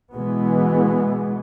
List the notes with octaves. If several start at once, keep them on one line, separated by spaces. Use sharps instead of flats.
B2 E3 G#3 B3